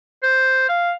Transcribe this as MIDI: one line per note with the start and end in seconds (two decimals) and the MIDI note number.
0.23 0.67 72
0.69 0.93 77